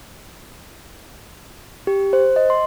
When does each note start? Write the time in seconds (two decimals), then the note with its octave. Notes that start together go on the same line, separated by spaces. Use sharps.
1.87 G4
2.13 C5
2.36 D#5
2.50 C6